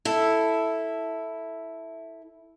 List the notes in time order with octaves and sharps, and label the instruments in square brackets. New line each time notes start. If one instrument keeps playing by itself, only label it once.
[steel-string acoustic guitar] E4 A4